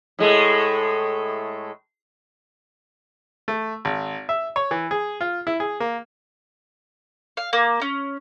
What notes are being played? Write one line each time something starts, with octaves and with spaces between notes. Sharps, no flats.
A2 G#3 A3
A3
G#1
E5
C#5
E3
G#4
F4
E4
G#4
A#3
F5
A#3
C#4